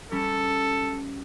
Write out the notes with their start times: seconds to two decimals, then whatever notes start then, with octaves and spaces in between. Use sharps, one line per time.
0.11 G3 C#4 G4 A4